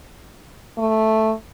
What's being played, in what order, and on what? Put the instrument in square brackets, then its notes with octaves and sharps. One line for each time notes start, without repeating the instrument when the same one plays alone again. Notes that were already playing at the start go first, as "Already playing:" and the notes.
[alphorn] A3